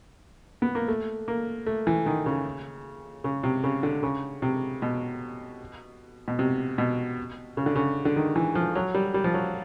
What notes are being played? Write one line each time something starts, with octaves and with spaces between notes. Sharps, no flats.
B3
A#3
A3
A#3
A3
E3
D#3
C#3
C#3
C3
C#3
D3
C#3
C3
B2
B2
C3
B2
C#3
D3
C#3
D3
D#3
E3
F3
F#3
G3
G3
F3
F#3